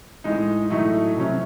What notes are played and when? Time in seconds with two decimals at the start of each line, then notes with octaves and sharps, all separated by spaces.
0.24 A2 G#3 D#4
0.70 A2 F#3 A3 D#4
1.17 C3 F#3 C#4